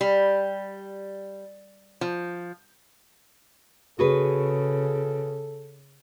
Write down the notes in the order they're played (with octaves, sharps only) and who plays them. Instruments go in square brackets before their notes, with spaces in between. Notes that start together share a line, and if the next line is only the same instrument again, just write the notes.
[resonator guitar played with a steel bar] G3
F3
[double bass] C#3 [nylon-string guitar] F#4 G#4 B4 [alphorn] A4